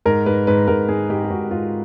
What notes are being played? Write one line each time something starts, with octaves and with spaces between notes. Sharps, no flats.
G#2 A#4
G#2 B4
G#2 B4
G#2 A#4
G#2 G#4
G#2 G4
G4
G#2 F#4
G#2 F4